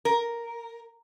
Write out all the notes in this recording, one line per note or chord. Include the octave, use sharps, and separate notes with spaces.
A#4